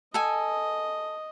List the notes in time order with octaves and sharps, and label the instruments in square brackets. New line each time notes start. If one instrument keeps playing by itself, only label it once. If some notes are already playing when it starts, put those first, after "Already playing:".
[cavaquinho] A4 G#5 [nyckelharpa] D#5